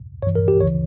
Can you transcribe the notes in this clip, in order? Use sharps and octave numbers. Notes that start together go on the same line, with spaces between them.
G2 E3 C#5
A#4
G4
D2 C#3 E3 C#5